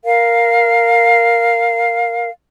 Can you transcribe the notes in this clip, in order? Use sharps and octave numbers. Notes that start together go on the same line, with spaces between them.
A#4 F5